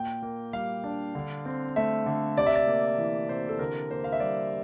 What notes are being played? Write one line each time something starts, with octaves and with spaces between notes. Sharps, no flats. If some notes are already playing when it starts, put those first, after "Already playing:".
Already playing: A#2 G5
A#3
G3 F5
D4
D3
C4
A3 E5
D3
C3 D5
E5
D5
A#3
E3
C3 C5
A4
D3 A#4
A#3 C5
F5
E5
G3 D5